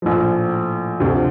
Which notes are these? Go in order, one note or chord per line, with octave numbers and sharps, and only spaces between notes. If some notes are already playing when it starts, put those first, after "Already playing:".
A#1 A2 F3
D2 C3 F3